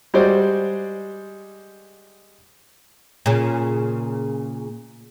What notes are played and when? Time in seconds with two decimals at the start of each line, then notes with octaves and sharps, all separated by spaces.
0.14 G3 G#3 F#4 C5 D5
3.26 A#2 C#3